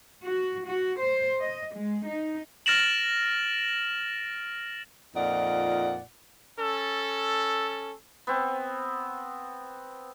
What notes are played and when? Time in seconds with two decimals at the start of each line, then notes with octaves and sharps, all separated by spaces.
0.23 F#4
0.65 F#4
1.00 C5
1.40 D#5
1.75 G#3
2.05 D#4
2.66 F6 A6 A#6 D7 E7 F#7
5.15 F2 A#2 D#4 D5 F#5
6.59 C#4 A4
8.27 B3 C4